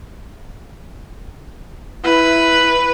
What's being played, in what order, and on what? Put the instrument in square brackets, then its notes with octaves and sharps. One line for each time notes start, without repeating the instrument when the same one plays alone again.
[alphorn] E4 [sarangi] B4